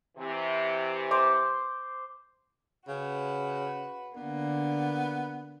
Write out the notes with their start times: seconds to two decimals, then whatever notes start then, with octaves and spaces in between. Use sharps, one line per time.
0.17 C3 E3
1.11 C5 C6 D6
2.88 C#3 F#4 B4
4.16 D3 A#3 B3